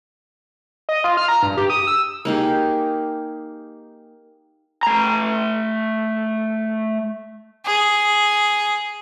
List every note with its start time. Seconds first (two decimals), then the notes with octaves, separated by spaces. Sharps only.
0.89 D#5
1.04 F4
1.17 F6
1.28 A#5
1.43 G2
1.57 G4
1.70 D#6
1.87 E6
2.25 A#3 D#4 G4 G#4
4.83 A3 A#5
7.66 G#4